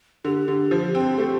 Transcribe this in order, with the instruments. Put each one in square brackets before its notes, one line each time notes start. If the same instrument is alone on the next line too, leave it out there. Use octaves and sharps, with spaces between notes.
[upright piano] D3 [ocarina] G4
[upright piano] D3
F3
C4
[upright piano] A3 [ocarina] G4